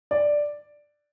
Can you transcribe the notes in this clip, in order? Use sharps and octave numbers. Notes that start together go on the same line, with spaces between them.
D5